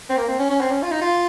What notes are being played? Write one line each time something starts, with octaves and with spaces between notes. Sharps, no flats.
C4
A#3
C4
C#4
C#4
C4
C#4
F4
D#4
F4